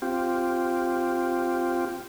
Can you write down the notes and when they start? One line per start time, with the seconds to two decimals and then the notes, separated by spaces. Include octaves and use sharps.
0.02 C4 F4 G4